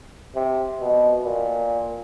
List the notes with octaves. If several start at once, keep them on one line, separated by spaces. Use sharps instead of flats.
C3
B2
A#2